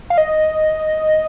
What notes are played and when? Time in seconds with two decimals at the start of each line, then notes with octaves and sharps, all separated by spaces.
0.10 F5
0.18 D#5